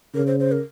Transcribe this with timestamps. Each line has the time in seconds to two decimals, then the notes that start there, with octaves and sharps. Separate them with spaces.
0.14 C#3 A#4
0.27 C5
0.40 C5
0.52 A#4